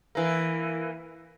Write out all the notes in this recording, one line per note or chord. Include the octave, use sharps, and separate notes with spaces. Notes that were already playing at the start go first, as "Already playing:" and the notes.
E3 A#3